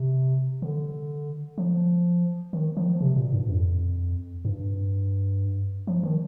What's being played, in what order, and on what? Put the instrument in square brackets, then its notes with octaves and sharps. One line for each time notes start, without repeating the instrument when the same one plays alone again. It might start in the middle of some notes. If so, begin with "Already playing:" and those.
Already playing: [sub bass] C3
D3
F3
D#3
F3
C3
A#2
G2
F2
G2
F3
D#3